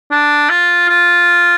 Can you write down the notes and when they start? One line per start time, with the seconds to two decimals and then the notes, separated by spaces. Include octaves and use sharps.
0.11 D4
0.49 F4
0.89 F4